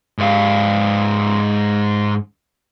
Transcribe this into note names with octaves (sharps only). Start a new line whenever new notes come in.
G#2 F5